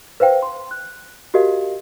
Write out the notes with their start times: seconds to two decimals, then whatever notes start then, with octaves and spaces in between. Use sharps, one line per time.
0.20 B4 C5 F5 G5
0.42 C6
0.71 F#6
1.34 F#4 G4 A#4 D#5 F5